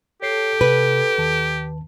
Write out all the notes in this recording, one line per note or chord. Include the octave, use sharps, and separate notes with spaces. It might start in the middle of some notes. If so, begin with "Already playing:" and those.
G4 A4 C#5 C7
C3 B4
D#2 D#3 A5